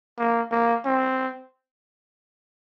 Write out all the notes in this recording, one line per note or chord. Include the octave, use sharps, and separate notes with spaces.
A#3
A#3
C4